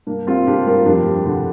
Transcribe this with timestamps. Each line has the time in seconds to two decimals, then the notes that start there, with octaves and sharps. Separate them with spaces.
0.07 G2 A#3 D4
0.27 G3 C4 F4
0.47 D3 D4 G4
0.66 G2 F4 A#4
0.86 F2 D4 G4
1.06 G3
1.26 D3